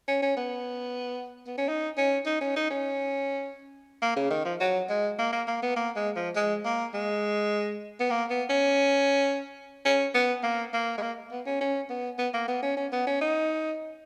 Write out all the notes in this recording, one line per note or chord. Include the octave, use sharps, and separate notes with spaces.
C#4
C#4
B3
B3
C#4
D#4
C#4
D#4
C#4
D#4
C#4
A#3
C#3
D#3
F3
F#3
G#3
A#3
A#3
A#3
B3
A#3
G#3
F3
G#3
A#3
G#3
B3
A#3
B3
C#4
C#4
B3
A#3
A#3
G#3
A#3
B3
C#4
C#4
B3
B3
A#3
B3
C#4
C#4
B3
C#4
D#4